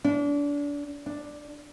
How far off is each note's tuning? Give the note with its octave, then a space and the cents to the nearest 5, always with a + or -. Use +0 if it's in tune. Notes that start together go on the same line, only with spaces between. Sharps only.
D4 -30
D4 +5